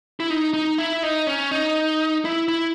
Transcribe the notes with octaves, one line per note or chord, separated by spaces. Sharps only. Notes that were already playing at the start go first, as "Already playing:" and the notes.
E4
D#4
D#4
E4
D#4
C#4
D#4
E4
E4